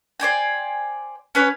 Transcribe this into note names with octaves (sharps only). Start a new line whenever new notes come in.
C5 D5 G5 G#5
C#4 B4 C#5